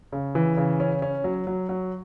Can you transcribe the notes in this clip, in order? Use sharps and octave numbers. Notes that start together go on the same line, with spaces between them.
C#3
E3
C#3
C#4
C#4
F#3
F#3
F#3